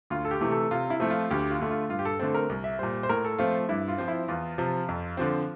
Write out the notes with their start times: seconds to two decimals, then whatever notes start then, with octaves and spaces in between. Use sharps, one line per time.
0.10 D2 F4
0.25 A4
0.31 G4
0.41 C3 E3 A3
0.51 A4
0.71 C3 F4
0.90 E4
1.00 F3 A3 C4
1.10 F4
1.30 D2 G4
1.51 F4
1.60 D3 A3
1.70 F4
1.89 G2 F4
1.99 G4
2.05 A4
2.19 D3 A3 C4 A4
2.35 A#4
2.49 C2
2.64 E5
2.79 A#2 G3 C5
3.03 C5
3.09 A2 A#4
3.25 A4
3.38 F3 A3 C4 F4
3.69 G2 E4
3.88 F4
3.98 F3 C4
4.08 E4
4.28 E2 F4
4.58 C3 F3
4.88 F2
5.17 D3 F3 C4